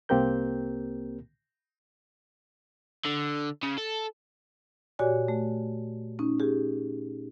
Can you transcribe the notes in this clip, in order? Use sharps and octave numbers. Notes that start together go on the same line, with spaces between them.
C2 A#3 C4 G4 A#4 G6
D3
C#3
A4
A#2 F#4 G4 C#5 D5 G#5
A3
C#4 D#4
G4 G#4